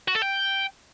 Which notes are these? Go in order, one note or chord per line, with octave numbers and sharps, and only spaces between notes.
F#4
A4
G5